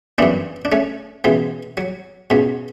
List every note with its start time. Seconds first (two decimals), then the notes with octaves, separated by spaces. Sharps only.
0.18 F#2 E3 B3 D4
0.65 D4
0.72 A3 C#4
1.24 C#2 B2 E3
1.77 F#3
2.30 C#2 B2